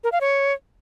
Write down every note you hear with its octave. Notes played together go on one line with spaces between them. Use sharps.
A#4
F5
C#5